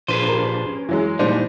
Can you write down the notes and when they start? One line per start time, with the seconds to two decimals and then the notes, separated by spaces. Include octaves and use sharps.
0.08 A#2 F3 D4 G#4 B4 C5 D#7
0.28 G4 A#4
0.69 C#4
0.89 E3 F#3 G#3
1.19 A#2 E3 F3 G3 G#3 D4 D#4 C5